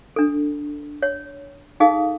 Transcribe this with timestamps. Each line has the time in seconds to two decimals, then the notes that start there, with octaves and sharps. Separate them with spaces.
0.16 D4 A4
1.03 C#5
1.80 D#4 G#4 A4 F5 D#6